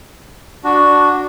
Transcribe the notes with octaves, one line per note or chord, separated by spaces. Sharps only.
D4 F#4